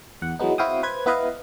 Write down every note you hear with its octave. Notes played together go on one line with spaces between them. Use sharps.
E2 F#5
E3 F#3 G#3 B3 D#4
C4 E4 F#4 F5 G5 D#6
B4 C5 G#6
B3 E4 B4 D#5 F5